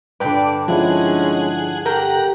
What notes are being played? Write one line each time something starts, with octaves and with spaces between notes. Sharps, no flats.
G2 D3 B4 D5 G5 B5
F3 G#3 C#4 D4 E4 G#4 C#5 F#5
G4 A4 A#4 F#5 A#5 G6